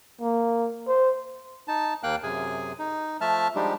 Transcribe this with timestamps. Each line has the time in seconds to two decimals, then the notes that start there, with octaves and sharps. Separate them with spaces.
0.21 A#3
0.88 C5
1.68 D#4 A5
2.03 D#2 A#3 F5 G5 F#6
2.23 F#2 C3 G#4 G#5
2.79 D#4
3.21 F3 A3 E5 A5 F6
3.56 F3 G3 G#3 D4 D#4 G4